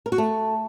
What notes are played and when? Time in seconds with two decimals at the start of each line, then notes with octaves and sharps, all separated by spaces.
0.06 A#4
0.12 F#4
0.18 A3